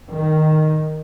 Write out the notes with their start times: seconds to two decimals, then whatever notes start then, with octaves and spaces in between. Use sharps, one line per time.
0.11 D#3